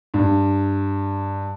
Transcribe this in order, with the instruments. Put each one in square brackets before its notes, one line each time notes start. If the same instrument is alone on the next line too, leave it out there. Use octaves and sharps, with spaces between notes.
[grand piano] G2